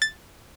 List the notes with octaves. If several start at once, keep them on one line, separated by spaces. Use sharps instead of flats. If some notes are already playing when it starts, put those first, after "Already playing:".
A6